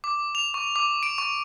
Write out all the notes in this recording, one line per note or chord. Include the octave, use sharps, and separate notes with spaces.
D6
F7
C#6
D6
D7
C#6